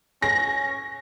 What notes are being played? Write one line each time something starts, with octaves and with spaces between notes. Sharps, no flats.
C#4 A#6